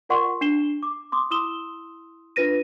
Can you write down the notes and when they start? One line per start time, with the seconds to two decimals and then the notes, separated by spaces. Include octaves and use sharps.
0.09 F4 A#4 D5 F#5 C6 C#6
0.41 D4 C7 E7 G7
0.83 D6
1.12 C6 D6 D#6
1.31 E4 C6 D#6 E6 E7 G7
2.36 D4 F4 B4 A#6 D#7